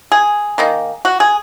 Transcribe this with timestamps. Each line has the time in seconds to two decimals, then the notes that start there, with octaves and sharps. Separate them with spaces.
0.12 G#4
0.58 D#3 A#3 D#4
1.05 F#4
1.20 G#4